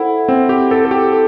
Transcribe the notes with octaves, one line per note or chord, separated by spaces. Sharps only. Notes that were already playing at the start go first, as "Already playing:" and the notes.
Already playing: E4 A4 C5 F#5
C4
G4
A4
A4
G4
A4